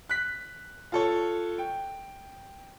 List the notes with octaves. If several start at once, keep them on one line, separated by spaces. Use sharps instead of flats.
F#6 B6
F4 A4 C#5
G5